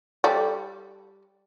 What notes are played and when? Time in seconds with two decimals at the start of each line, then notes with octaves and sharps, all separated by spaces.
0.24 G3 A4 D5